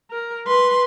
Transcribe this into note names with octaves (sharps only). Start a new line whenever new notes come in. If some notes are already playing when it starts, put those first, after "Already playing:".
A#4
B4 C6